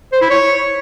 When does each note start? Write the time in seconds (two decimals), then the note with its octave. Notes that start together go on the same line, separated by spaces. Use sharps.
0.12 C5
0.21 E4
0.30 C#5